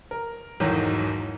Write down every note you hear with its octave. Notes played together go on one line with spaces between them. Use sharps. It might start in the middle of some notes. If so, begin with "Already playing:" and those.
A#4
B1 E2 G#2 D#3 F#3